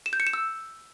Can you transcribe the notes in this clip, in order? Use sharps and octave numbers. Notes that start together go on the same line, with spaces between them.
E7
G6
C#7
E7
E6